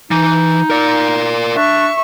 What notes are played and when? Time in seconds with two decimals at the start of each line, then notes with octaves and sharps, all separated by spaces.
0.11 E3 D#4
0.70 A#4 D5
1.56 D4 E5 C#6